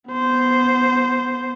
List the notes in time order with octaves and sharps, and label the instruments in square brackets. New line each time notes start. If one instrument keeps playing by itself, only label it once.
[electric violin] B3 C5